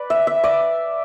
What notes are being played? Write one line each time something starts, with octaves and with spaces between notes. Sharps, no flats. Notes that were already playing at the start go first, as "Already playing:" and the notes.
Already playing: B4 D5
E5
E5
D5